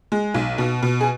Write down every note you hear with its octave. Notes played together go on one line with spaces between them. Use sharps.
G#3
B1
B2
B2
G#4